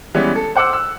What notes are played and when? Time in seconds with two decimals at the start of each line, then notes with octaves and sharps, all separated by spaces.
0.15 E3 G3 G#3 B3 C#4
0.35 A4
0.56 C5 F#5 D6 E6 F#6
0.73 E6